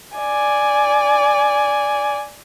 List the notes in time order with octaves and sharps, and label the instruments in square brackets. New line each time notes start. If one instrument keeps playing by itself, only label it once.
[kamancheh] D5 G#5